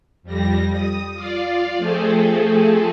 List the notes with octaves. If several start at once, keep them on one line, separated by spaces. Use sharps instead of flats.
F2 G3 A#6
D#6
F4 D5 F5
F3 A3 C4 G#4 A4